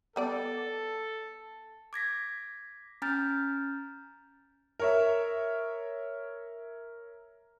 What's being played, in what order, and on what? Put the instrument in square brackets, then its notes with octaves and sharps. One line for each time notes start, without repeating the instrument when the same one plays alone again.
[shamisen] G3 B3 D5 [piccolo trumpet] A4
[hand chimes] D6 G#6 A#6 B6
C#4 G#5 A#5 F6 G6 A6
[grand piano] A#4 C#5 E5